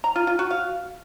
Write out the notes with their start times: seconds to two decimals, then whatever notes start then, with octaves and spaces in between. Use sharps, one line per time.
0.04 A#5
0.16 F4
0.27 F4
0.39 F#4
0.51 F5